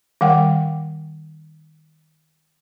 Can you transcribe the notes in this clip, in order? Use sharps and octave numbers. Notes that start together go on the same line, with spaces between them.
D#3 G3 A#4 F#5 G5